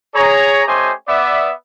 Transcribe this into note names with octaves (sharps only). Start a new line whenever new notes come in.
G#4 C#5 A#5
A3 C#4 G4 C5 D#5 G#5
B3 D5 E5